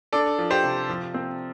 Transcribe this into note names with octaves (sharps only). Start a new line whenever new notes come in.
D4 A4 D5
F3
G4 C5
C3
F3
C4